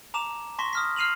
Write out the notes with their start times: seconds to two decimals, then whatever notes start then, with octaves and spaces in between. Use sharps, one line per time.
0.14 A5 A#5 D6 E7
0.59 A5 C6 C#6 A#6 B6
0.73 D#6 F6 B6
0.96 F6 C7 D#7 F7 F#7